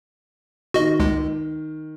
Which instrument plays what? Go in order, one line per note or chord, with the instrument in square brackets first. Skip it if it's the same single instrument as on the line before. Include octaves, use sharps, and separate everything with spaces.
[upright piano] D#3 [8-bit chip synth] F#4 D#5
[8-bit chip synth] C#2 G#3